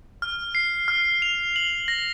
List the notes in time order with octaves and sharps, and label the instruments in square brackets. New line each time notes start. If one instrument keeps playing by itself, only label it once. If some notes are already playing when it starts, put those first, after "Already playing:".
[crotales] F6
C7
F6
F7
F#7
A#6